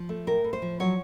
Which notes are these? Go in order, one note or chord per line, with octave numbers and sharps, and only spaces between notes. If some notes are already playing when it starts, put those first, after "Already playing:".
Already playing: F3
A3
A2 A#4
A2
C5
F3
F#3 C#5